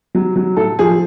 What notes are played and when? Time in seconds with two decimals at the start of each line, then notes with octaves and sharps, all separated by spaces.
0.15 F#3
0.36 F#3
0.57 A2 A4
0.79 F3 G#4